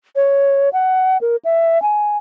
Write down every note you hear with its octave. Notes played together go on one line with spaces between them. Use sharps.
C#5
F#5
A#4
E5
G#5